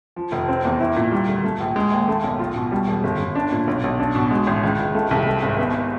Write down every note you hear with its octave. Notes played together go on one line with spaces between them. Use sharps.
F3
F1
C4
E2
E4
A#2
G3
D2
A3
A#1
G#3
D#2
A3
B1
F4
B2
G3
E1
G1
G1
D4
A#2
B1
B1
D4
B2
G#3
A1
C#2
C#2
A3
C2
A3
G#1
B3